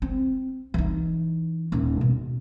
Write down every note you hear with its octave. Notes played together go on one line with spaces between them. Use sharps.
C4
E3 D#4
D#1 D#4
B2